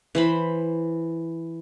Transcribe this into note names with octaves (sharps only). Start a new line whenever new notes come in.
E3 C5 B5